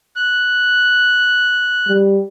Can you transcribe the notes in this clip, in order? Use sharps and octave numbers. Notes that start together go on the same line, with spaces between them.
F#6
G3